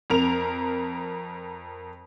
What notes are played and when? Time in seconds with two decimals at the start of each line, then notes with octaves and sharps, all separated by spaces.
0.10 F2 A#4 F7